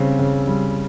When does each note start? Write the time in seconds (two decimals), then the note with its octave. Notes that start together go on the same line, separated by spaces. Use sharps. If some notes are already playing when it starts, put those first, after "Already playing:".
Already playing: C#3 G3 C4
0.19 C#3
0.47 G3